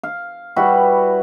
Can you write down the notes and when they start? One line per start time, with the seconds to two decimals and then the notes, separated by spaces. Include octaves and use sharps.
0.03 F5
0.56 G3 E4 F#4 B4